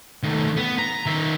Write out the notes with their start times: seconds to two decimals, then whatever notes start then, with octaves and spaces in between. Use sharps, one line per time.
0.23 D#3 A3
0.57 B3
0.79 A#5
1.06 D#3 E5